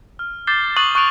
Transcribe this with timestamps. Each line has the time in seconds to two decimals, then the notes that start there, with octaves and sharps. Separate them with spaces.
0.19 F6
0.47 D6 G6 A6 C7 G7
0.77 C#6 D#6 F#6 A6 D#7 F#7
0.95 C#6 F#6 G6 D7 F7 F#7